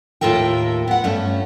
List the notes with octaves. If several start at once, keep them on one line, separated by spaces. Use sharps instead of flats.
D#2 A2 F4 A4 A#4 G5
B3 F#5
G2 A3 C#4